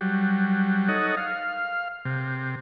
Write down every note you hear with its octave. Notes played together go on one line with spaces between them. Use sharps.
F#3 G3
D#4 A4 C#5 D#5 F#5
F5
C3